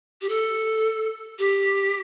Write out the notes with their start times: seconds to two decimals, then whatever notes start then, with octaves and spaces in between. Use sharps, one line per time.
0.21 G4
0.29 A4
1.39 G4